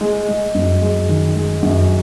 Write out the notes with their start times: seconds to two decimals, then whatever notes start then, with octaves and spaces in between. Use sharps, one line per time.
0.01 G#3
0.28 G#3
0.55 F#2
0.81 G#3
1.09 D#3
1.36 G#3
1.63 F#2